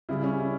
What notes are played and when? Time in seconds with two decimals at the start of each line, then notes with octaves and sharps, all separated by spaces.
0.09 C#3 G3 E4
0.24 C#4
0.39 E4